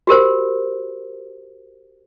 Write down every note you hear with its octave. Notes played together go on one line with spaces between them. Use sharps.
F#4 G4 A#4 C5